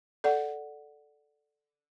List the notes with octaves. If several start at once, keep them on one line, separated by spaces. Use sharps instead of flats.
A4 D5 F#5